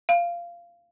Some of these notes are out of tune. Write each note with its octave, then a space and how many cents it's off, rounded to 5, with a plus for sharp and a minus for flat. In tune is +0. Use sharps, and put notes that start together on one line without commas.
F5 -15